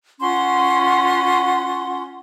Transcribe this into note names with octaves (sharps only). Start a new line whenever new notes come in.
C#4 F4 F#5 C6